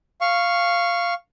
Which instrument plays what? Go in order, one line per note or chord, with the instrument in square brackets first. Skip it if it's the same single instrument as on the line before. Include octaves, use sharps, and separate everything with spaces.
[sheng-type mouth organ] F5 C#6